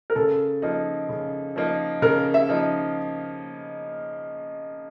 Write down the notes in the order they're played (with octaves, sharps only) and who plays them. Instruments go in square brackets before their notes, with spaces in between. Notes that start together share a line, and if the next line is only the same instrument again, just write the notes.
[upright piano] A#4
[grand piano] C#3 [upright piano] A4
[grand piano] F3 A#3 D#4
C#3
F3 A#3 D#4
[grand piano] C#3 [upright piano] A#4
[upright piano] E5
[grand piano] F3 A#3 D#4